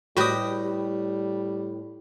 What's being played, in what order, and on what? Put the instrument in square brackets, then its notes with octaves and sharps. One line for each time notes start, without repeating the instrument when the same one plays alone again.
[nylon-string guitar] A2 [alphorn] G3 [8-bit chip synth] F#4 D#6 [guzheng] G4 B4 D#5